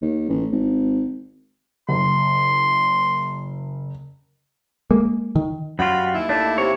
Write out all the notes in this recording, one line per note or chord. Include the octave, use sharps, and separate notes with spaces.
D#2
A1
G#1
F#1 C6
G#3 A#3
D#3
F#2 G3 F4 F#4 B5
D#2 E4
A3 D4
C3 C#5